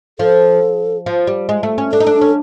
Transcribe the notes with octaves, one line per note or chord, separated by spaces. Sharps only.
F3 A4
F3
G3
G#3
A3
C#4
D4 A4
D#4
D4
C#4